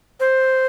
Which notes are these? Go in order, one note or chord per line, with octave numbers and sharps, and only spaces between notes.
C5